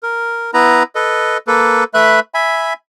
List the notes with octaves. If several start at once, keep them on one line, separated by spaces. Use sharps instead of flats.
A#4
B3 E4 B4 A#5
A4 B4 D#5
A#3 A4 B4
A3 B4 E5 B5 F#6
E5 G#5 B5